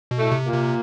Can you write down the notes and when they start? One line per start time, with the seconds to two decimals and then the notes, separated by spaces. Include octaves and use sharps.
0.11 B2
0.18 A2 A3
0.32 C3
0.45 A#2 A#3
0.52 C3